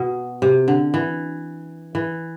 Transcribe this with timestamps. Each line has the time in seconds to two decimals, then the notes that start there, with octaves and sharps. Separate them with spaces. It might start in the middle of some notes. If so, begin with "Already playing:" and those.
Already playing: B2
0.42 C3
0.68 D3
0.94 E3
1.95 E3